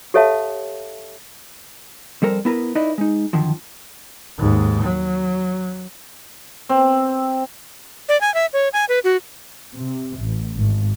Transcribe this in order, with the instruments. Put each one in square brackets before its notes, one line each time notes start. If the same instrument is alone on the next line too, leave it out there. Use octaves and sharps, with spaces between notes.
[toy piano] G4 A4 C#5 E5 F5 A5
[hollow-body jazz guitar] F2 G3 A4 A#4 C5
B3 E4 A#4 B4
D#4 E4 B4 D5 D#5
G#3 D#4
F#2 D3 D#3 F3
[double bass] D#2 G#2
F#3
[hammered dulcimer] C4
[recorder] D5
G#5
E5
C#5
G#5
B4
F#4
[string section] C3
A1
G#1